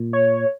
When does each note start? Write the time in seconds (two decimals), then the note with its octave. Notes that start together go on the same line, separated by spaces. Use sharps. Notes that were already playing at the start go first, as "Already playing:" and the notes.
Already playing: A#2
0.13 C#5